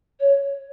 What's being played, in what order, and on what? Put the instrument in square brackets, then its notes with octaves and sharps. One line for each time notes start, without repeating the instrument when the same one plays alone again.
[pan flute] C#5